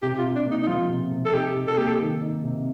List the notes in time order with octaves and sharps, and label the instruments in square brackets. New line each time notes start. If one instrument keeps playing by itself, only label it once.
[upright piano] C3 [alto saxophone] G4
[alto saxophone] F4
[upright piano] C3
[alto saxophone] D4
[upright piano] A#3 [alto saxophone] D#4
[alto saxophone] D#4
[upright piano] F3 [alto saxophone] F4
[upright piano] C3
C3
[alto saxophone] A4
[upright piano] D#4 [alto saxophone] G4
[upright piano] C3
[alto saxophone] A4
[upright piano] A#3 [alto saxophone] G4
[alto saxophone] A4
[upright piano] D#3
D#4
C3